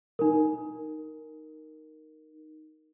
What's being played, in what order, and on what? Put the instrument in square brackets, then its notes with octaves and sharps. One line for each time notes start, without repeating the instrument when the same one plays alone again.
[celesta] D#4 A#4